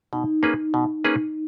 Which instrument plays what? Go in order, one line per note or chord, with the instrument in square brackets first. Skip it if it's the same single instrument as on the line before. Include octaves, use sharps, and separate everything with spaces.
[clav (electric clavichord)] B2 [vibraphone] D#4
[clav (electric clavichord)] A#3 C#4 G#4 B4
B2
A#3 C#4 G#4 B4